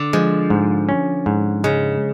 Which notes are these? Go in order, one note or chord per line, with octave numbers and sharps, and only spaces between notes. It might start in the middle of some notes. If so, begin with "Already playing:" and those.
Already playing: D3
F3 G#3
G#2
C#4
G#2
C#3 G#3